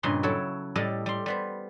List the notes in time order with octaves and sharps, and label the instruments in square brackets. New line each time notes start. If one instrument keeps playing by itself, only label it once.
[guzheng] G2 A#2 C#3 D#5 C6
F#3 E4 A4 C#5
A2 G3 A4 D#5
G3 C6
G3 B3 C5